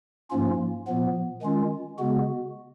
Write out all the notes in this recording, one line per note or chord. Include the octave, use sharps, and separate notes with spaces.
G#2 F3 A#3 C#4 F4
A#2 F3 B3
D#3 G#3 C#4 F4
C#3 G#3 B3 F#4